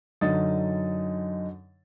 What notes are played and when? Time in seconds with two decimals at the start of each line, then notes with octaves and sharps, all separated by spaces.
0.21 F#2 D3 D#4 D#6 A6